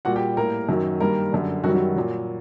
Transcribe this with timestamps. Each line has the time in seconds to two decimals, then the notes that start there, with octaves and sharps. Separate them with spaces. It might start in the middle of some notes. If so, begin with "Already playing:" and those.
0.05 A#2 G3 F#4 F#5
0.16 G4 G5
0.37 A2 G3 A#3 A#4
0.69 F#2 D#3 F#3
1.00 G2 D#3 G3 A#3 A#4
1.32 F#2 D3 G3
1.64 F#2 D#3 F#3 G3 F#4
1.74 F#3 F#4
1.96 A#2 F#3